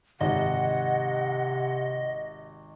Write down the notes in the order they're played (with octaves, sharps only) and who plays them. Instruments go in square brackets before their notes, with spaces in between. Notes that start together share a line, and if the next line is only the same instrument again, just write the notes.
[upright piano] G#1 [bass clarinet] C3 [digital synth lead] D#5 [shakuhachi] F#5